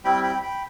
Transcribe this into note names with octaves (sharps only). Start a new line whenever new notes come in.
G3 C4 E4 G5 B5
G5 B5
G5 B5